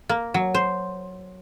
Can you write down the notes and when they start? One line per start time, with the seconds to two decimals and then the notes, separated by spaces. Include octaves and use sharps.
0.09 A#3
0.34 F#3
0.54 C5